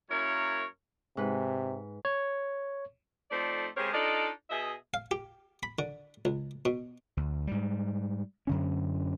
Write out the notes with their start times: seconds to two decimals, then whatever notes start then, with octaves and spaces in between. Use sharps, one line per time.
0.11 F#2 A#3 E4 A#4 C#5
1.17 G#2 C3 B4
2.05 C#5
3.31 F2 A3 C4 D#4 D5
3.76 C#3 G#3 C4 G4 A#4 C#5
3.93 D4 D#4 F4 A4 D5 D#5
4.50 B2 G#4 D#5 E5
4.94 F5
5.11 G4
5.63 B5
5.79 D3
6.25 C#2
6.65 B2
7.17 D2
7.47 G#2 G3
8.47 F#2 D3 C#4